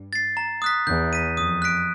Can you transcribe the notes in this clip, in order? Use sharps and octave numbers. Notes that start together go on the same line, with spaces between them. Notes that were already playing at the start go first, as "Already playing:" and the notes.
Already playing: G2
A6 C7
A#5
D#6 F#6 B6
E2 G6
B6 D#7
F2 D#6
F#6 B6 D7